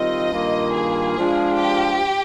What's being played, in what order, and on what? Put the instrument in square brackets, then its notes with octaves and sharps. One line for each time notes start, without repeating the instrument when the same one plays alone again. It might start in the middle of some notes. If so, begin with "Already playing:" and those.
Already playing: [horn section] D#3 G3 C4 F4 [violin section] D#5
[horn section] G2 D#3 A#3 F4
[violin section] G#4
[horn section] F3 G#3 D4 F4
[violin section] G4